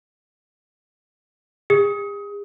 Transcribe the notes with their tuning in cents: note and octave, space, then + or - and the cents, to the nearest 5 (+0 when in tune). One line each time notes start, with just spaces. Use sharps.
G#4 -45 D#6 +25